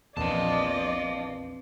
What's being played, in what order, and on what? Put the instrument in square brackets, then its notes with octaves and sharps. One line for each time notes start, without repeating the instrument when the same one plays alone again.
[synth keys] A#1 E2 [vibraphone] C4 B4 [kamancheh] D5 D#5 [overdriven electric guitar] F5 A5